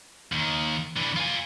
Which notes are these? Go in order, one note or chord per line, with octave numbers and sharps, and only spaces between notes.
D#2 D#3
E3 D4
F4 G#5